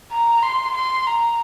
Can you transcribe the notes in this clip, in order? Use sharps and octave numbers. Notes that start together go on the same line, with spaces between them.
A#5
C6
C6
A#5